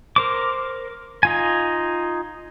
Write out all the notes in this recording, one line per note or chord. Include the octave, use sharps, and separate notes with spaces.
A#4 C5 D6
D#4 F4 G#5